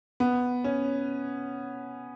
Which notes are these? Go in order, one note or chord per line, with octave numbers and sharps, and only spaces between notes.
B3
C#4